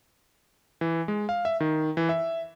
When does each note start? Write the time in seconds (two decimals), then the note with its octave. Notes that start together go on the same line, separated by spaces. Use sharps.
0.81 E3
1.08 G#3
1.29 F5
1.45 E5
1.60 D#3
1.97 E3
2.09 E5